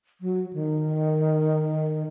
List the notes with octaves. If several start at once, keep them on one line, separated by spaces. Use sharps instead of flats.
F#3
D#3